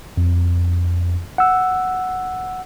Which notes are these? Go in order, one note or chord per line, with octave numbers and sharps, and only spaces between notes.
F2
F#5 E6